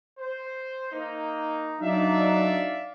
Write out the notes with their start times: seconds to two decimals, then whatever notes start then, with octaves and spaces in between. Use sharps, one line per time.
0.17 C5
0.91 A#3 D#4
1.81 F#3 D4 D#4 D5 E5 F5